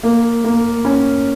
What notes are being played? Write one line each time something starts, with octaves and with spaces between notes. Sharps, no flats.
A#3
A#3
C#4